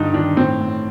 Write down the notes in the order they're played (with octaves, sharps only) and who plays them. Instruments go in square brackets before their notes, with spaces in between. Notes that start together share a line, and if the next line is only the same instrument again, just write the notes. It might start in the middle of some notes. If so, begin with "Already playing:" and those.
Already playing: [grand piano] G2 D3 D#4
D#3 D4
A2 C4
A2